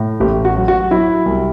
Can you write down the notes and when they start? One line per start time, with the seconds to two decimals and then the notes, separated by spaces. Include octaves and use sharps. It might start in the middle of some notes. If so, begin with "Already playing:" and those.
Already playing: A2
0.20 A1 G4
0.45 F#4
0.57 F#3
0.68 F#4
0.91 F#3 E4
1.26 C2